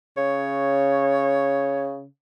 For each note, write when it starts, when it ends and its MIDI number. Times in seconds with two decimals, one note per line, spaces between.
0.17 2.05 49
0.17 1.86 73